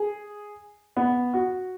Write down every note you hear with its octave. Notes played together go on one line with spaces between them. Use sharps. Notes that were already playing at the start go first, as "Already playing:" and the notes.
Already playing: G#4
B3
F#4